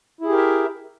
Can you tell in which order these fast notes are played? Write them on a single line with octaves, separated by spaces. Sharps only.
E4 G#4 G4 A#4 E5